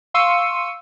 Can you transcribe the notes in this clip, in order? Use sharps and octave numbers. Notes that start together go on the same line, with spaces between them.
F5 C6 C#6 E6 C#7 D#7